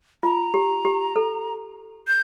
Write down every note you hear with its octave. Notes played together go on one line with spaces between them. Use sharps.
F4 A#5
G4
G4
A4
G6